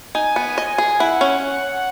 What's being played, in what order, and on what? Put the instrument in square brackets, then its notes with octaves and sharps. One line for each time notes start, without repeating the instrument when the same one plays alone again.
[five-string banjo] D#4 [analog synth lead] G#5
[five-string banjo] B3
D#5
G#4
[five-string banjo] E4 [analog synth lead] F#5
[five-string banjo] C#4